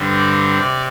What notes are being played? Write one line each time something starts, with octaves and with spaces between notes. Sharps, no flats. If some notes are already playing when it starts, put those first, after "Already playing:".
Already playing: G2 D3 G3 C4
D5
C3 D5